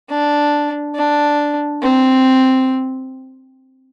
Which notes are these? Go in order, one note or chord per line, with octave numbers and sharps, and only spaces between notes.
D4
D4
C4